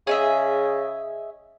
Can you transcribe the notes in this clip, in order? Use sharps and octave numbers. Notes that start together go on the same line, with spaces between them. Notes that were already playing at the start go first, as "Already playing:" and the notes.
C#3 G#4 D#5 E5